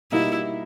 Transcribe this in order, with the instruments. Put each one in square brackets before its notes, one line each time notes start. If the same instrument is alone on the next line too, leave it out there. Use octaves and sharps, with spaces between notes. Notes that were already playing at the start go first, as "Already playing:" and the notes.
[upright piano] B2 G3 A#3 D#4 [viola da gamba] E4